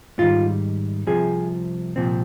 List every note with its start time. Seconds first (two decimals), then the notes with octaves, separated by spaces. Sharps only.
0.18 G#2 D#3 G3 F4
1.07 C2 C3 F3 G#4
1.96 C2 A#2 F3 C4